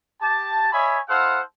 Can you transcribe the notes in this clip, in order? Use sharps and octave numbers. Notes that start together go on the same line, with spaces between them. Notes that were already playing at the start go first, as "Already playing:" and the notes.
G4 A5
C#5 D#5 E5 G#5 B5
E4 A4 C5 F5 F#5